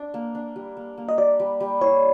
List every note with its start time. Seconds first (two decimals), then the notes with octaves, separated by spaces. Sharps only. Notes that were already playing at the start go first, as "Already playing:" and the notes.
Already playing: D4
0.14 A#3
0.35 D4
0.56 G3
0.77 A#3
0.98 A#3
1.09 D#5
1.18 G4 D5
1.40 G3
1.60 G3
1.81 E4 C#5